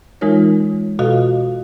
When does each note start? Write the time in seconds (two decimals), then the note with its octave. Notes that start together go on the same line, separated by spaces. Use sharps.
0.21 E3 G#3 D#4 F4 A#4 C#5
0.99 B2 F4 F#4 A4 D#5 F5